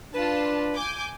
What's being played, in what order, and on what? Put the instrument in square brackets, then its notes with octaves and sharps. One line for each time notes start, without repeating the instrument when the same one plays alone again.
[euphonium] D4 [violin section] F4 A5 [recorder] B4
[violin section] G#5 D6 G6